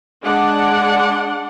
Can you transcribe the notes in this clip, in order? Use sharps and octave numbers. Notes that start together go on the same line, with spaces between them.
G#3 D4 D5 F#5